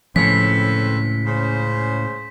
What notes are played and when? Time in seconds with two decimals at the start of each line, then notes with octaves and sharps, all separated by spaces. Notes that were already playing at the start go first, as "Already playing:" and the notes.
0.16 C#2 A2 F3 C4 C#4 A4 B4 B6
1.26 C#3 C5